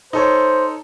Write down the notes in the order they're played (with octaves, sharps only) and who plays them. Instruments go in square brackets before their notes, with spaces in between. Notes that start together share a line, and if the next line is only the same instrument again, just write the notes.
[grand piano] D#4 A4 C#5 [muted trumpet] C5